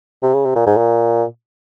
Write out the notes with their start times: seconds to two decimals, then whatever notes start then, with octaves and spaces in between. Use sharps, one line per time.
0.23 C3
0.34 C#3
0.46 C3
0.56 A#2
0.67 G#2
0.77 A#2